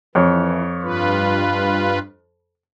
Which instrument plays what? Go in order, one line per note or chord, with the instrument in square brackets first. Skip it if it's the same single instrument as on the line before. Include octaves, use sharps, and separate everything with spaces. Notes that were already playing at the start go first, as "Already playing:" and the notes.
[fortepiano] F2 C#5 [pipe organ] E3
[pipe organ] G2 F4 B4